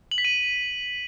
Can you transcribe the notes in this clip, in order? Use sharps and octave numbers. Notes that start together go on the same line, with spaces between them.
F#7
B6
D#7